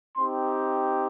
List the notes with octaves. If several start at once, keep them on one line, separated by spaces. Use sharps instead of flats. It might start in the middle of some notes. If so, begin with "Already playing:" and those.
C4 D#4 G4 C6